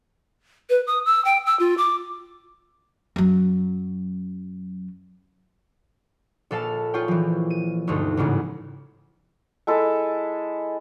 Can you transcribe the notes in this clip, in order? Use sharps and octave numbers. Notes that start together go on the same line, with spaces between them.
B4
D#6
E6
G5
E6
F4
D6
F#2 F#3
A#1 A4 F5 A5
F4 G#4 C#5 G5
E3 F3
D#7
E1 D2 G2 D#4
A1 E2 G#2 C#3
G#3 E4 A4